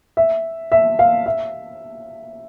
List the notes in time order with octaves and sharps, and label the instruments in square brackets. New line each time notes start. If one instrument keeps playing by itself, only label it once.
[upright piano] E5
E5
F5
E5